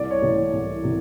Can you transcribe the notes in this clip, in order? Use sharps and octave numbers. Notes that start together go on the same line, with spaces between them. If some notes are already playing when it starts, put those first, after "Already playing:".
Already playing: C2 D5
C#5
C3 E3 A3 C4
C2
C3 E3